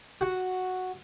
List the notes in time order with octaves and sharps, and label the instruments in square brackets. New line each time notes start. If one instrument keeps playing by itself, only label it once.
[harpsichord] F#4